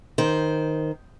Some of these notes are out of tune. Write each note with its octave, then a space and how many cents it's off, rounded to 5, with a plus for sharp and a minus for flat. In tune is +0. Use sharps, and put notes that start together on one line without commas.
D#3 +0 C5 +0